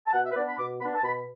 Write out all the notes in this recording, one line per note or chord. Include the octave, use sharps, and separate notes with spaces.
A5
B2 F#5
E5
B4
B3 D4 D5
B5
B2 D6
B3 D4 B5
A5
B2 B5